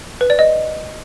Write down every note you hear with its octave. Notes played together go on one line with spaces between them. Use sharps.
B4
D5
D#5